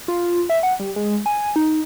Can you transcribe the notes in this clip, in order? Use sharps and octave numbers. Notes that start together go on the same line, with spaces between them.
F4
E5
F#5
G3
G#3
G#5
D#4